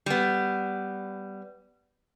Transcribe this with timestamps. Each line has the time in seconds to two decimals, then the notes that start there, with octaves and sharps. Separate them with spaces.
0.06 G3 B3